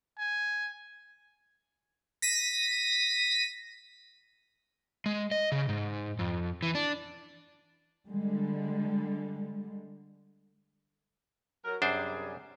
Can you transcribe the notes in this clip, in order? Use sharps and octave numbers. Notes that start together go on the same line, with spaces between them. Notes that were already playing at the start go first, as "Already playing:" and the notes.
G#5
A#6 B6 D#7
G#3
D#5
C#3
G#2
F2
E3
D4
D3 G3 G#3
F#3 A#4
F#2 C3 G3 D4 G#4 C5